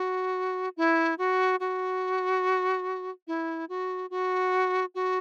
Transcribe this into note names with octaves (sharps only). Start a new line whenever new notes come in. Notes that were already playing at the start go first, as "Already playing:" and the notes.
Already playing: F#4
E4
F#4
F#4
E4
F#4
F#4
F#4